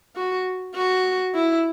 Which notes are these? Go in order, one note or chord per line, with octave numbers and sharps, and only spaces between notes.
F#4
F#4
E4